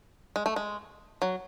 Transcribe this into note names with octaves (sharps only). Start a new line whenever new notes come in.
G#3
A3
G#3
F#3